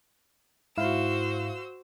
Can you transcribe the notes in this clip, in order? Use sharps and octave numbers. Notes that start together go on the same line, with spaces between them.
G#2 E4 F#4 C5 F5 E6